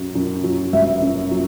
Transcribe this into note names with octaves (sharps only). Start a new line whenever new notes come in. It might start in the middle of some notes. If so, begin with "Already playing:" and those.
Already playing: F#2 F#3
F#2
F#3
G1 E5
F#2
F#3